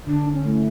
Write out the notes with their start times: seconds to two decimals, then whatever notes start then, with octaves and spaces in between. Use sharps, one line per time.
0.07 D3 D4
0.33 C#4
0.45 A3 E4